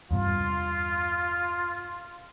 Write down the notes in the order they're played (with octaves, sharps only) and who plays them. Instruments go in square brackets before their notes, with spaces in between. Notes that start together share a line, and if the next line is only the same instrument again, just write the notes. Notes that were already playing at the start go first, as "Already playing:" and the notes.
[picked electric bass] E2 G2 C3 [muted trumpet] F4